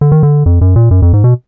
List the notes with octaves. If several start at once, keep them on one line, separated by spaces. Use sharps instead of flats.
D3
D#3
D3
F2
F#2
A#2
F#2
F2
G#2
B2